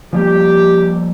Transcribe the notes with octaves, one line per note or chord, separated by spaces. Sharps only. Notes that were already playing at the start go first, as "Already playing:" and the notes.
F3 G3 A#3 G4